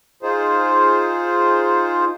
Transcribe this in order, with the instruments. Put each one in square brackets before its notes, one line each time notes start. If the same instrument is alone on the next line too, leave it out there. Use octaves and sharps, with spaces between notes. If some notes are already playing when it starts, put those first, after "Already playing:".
[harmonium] D#4 F4 G#4 C5